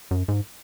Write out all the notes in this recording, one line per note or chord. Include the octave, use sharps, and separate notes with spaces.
F#2
G#2